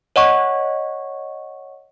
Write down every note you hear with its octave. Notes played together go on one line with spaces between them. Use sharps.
C#5 D#5 F#5 C#6